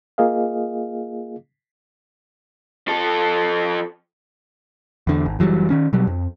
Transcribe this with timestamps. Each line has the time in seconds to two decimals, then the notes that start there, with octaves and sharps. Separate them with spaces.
0.18 A#3 F4 G#4 D#5 F5
2.88 F3 A4
5.07 E2 D3
5.26 G#1
5.39 F#1 E3 F#3 G3
5.70 D#3 C#4
5.93 B2 F#3 G3
6.07 F2